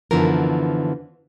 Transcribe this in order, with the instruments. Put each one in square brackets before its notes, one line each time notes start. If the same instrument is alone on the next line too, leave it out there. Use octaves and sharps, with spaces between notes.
[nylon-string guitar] F#2 D3 E3 F3 B3 A#4